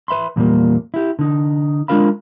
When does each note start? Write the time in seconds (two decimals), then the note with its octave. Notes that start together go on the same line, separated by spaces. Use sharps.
0.08 B4 E5 B5 C6
0.36 E2 A#2 G3 G#3 A#3
0.94 E4 G4
1.19 D3 D#4
1.88 G#3 D4 F4 A#4 F5 B5